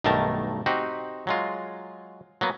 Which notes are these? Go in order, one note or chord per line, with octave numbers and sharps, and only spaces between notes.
B1 G2 D#3 A3 A#4 A5
C4 D#4 F#4 G4
F#3 G#3 F4
F#3 A#3 B3